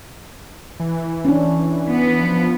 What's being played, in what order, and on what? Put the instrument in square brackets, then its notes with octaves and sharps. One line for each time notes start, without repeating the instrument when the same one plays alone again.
[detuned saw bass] E3
[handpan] C#4 D4
[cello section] B3
[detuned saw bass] F3